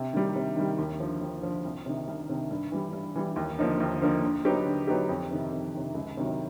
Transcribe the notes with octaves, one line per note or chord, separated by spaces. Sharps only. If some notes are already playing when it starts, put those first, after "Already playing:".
Already playing: C3
D#3 G3
C3
D#3 G3
D#2
D3 F3
D#2
D3 F3
C2
C3 D#3
C2
C3 D#3
G2
E3 G3
G2
E3 G3
D#2
D3 F3 A#3 D#4
D#2
D3 F3 A#3 D#4
D3
F#3 B3 D#4 G4
D3
F#3 B3 D#4 G4
F2
C3 D#3
F2
C3 D#3
C#2
C3 D#3 F#3